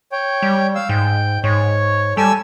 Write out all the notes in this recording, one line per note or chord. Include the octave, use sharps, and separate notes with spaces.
C#5 G5
G3
F5 E6
G#2 G5
G#2 C#5
G3 A4 G#5 E6